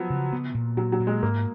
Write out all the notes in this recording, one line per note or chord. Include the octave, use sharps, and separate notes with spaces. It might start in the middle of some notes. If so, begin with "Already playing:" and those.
Already playing: F3 F#3 B3
C#3
B3
A#2
A#2 F#3
F#3
A#2
G#3
G#2 A#3